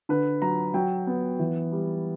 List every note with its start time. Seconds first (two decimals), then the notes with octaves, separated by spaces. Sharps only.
0.09 D3 B4
0.42 F#3 A#5
0.74 F#3 G5
1.07 B3
1.39 E3
1.72 G3